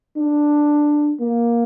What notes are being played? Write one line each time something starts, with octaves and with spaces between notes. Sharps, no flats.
D4
A#3